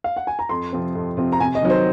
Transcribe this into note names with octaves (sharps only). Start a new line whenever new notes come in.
F5
F#5
G#5
A#5
F2 C6
C3 F3 C4
F2
C3 F3 C4
A#5
C3 G#5
D#5
D#3 F#3
C5